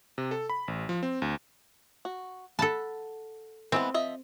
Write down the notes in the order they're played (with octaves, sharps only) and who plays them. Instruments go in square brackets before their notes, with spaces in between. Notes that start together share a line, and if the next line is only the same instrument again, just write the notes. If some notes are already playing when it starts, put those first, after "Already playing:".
[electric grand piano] C3
A4
B5
A1
F3
C4
D2
[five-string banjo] F#4
[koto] A4 A5 [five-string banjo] F#5 B5
[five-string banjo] E3 G#3 B3 [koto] C4
[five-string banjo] F3 D#5 E5